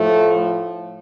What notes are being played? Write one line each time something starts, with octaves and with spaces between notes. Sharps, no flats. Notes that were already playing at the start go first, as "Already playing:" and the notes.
Already playing: A2 F3 A3